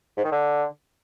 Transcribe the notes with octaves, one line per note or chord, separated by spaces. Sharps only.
G#2
D#3
D3